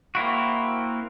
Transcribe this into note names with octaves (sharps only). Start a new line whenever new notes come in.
A#3 C4 E4 F#4